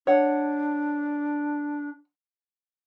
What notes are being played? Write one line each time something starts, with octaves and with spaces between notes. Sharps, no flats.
D4 C#5 F#5